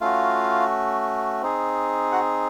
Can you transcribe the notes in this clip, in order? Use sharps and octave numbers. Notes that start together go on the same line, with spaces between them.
A3 C#4 F4 F#4 F5
C4 D#4 G#4
F#4 F#5